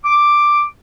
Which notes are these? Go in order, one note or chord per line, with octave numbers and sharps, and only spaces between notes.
D6